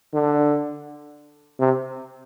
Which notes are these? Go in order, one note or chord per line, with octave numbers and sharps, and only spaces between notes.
D3
C3